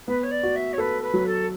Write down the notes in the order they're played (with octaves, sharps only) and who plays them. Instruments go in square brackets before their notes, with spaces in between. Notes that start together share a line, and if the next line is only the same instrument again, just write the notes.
[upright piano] B3 [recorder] B4
[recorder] C#5
D5
[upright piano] F#4
[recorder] E5
C#5
[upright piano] A4 [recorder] B4
[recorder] B4
[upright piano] F#3
[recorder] A4